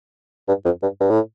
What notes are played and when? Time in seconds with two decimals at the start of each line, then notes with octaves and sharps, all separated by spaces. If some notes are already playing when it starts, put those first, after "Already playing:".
0.48 G2
0.65 F2
0.82 G2
1.00 G2
1.10 A2